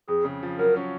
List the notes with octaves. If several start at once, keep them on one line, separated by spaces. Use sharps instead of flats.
F2 G#4
C#3
F3
F#3 A#4
C#4